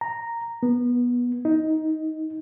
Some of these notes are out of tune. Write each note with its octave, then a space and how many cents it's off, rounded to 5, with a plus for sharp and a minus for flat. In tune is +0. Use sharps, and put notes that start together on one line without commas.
A#5 -5
B3 -20
D#4 +15